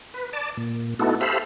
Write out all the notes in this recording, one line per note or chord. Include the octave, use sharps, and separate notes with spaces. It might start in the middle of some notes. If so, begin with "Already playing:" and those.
B4
D5 A5
A#2
A3 B3 D#4 E4 F#4 A4
G4 A4 C5 E5 F5 B5